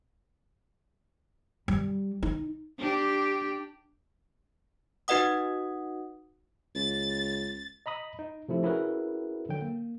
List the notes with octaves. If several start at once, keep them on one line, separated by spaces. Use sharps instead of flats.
G3
D#4
D4 G4
D#4 F#4 B4 D#5 F#5 D#6
C#2 A6
D#5 A#5 B5 D#6
D#4
C3 F3 A3 E4
C#4 E4 F#4 G#4 A#4 B4
D3 F#3 G5
A#3